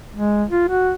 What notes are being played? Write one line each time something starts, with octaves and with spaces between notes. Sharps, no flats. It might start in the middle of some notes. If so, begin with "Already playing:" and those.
G#3
F4
F#4